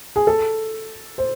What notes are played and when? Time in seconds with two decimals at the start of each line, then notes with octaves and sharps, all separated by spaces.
0.16 G#4
0.27 A4
1.18 C5